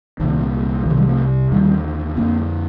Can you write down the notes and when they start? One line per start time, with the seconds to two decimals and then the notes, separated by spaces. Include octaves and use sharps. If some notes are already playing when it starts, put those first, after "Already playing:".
0.20 C2 A#2 D#3
0.85 C2 D#3
0.90 C3
0.97 D#3 G3
1.08 F3 A3
1.51 D#2 D3 D#3 G3
2.17 F2 D3 A#3 D4